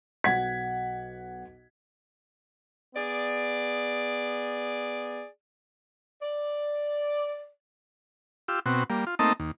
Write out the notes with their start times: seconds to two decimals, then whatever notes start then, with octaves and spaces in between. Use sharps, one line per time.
0.24 B1 F#5 G#6 B6
2.95 B3 G#4 D5
6.22 D5
8.48 F4 G4 E6
8.66 B2 C4 F#4
8.90 G3 A#3
9.07 F4
9.19 A3 A#3 C4 D#4 D#5 A5
9.40 D#2